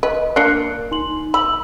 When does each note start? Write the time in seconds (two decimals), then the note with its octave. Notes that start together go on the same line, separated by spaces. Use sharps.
0.03 B4 D#5
0.36 A#3 D4 F#6 C7 C#7
0.52 A#4
0.91 D#4 C6 F#7
1.34 B5 E6 F#7